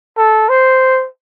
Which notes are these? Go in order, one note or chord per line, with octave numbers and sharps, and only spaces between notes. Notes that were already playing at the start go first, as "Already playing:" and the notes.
A4
C5